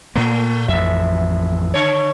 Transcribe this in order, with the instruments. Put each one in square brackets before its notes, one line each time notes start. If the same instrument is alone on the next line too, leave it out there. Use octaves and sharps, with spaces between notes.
[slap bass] A#2 A#3 [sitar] A3
[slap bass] A1 F2 [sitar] E5
[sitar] D3 C#5